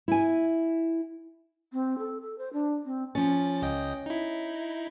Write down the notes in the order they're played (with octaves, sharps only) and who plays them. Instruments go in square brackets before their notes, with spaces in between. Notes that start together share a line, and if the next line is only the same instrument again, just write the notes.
[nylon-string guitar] E4 G#5
[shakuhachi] C4
A4
A4
C5
D4
C4
[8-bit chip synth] F3 A6 [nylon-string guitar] C#4
[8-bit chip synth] C#2 D#5 G5
D#4 E4